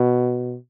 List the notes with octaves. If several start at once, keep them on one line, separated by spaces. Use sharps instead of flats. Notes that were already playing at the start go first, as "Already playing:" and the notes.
Already playing: B2